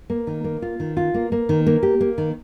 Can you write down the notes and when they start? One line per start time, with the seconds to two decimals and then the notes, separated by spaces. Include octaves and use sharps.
0.10 A#3
0.27 D#3
0.44 A#3
0.62 F4
0.80 D#3
0.97 F4
1.14 A#3
1.32 A#3
1.49 D#3
1.67 A#3
1.83 G4
2.01 A#3
2.18 D#3